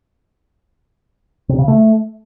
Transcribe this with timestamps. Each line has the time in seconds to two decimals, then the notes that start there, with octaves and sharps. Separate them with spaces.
1.49 C3
1.59 C#3
1.68 A3